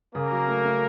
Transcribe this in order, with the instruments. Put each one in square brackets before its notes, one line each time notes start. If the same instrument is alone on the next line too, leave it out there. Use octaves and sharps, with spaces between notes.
[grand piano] C#3 [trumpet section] A#3 A#4
[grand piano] F#3
A3
A3